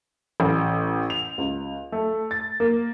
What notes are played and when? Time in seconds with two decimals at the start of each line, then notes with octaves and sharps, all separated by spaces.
0.40 A1
1.10 F7
1.38 C#2
1.92 A3
2.31 A6
2.60 A#3